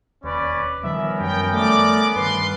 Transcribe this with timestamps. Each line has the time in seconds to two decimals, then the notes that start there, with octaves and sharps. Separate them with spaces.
0.24 E1 D#2 C#4 B4 D5
0.83 D#3 F3 G3 B3 C#4 A#4 E5
1.19 F#2 G5
1.53 A3 D5 D6
2.16 G2 D#3 B4 C6